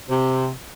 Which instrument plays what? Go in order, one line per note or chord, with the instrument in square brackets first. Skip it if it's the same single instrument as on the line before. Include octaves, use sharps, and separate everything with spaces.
[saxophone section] C3